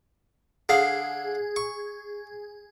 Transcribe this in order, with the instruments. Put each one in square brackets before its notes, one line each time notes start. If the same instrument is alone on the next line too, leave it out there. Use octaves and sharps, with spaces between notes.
[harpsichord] D3 F5 [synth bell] G#4
[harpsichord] C#6